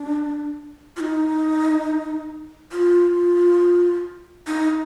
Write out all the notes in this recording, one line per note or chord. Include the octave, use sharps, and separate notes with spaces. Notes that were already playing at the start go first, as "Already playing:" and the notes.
Already playing: D4
F4
D#4
F4
D#4